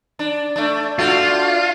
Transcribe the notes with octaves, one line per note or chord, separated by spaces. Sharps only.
D4
A3 D4
A3 D4 F4 F#4